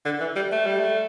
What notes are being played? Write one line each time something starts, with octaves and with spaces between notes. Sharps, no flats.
D3
E3
G3
A3
G3
A3